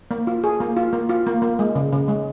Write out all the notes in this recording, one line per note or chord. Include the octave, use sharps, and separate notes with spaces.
A#3
F4
G#4
A#3
F4
A#3
F4
A#3
A#3
G#3
C#3
C#3
G#3